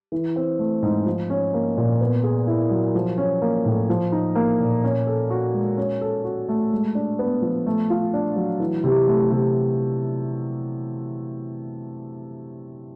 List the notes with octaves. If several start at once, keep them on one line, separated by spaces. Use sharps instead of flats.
E3
C4
A3
G#2
F3
C#4
A#3
A#2
B3
G#4
E4
F#3
F3
C#4
A#3
A2
F3
D#4
A#3
A#2
C#4
A4
F#4
G#3
C#4
A4
F#4
A3
G#3
D4
B3
F3
A3
F4
D4
F#3
E3
C3
A3
C3